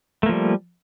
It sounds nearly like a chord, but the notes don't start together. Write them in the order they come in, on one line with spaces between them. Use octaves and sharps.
A3 A#3 F3 G3